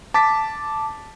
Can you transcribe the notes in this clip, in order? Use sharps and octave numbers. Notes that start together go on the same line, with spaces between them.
A5 D6 A6 B6